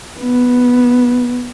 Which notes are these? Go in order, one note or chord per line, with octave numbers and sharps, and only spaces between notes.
B3